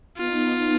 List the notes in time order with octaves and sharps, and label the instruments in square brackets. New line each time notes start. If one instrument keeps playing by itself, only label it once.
[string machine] B3 D#4 [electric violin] F4